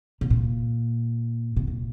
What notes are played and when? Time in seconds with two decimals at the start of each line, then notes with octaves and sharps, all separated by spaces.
0.21 B2
0.30 A#2
1.56 B2
1.67 A#2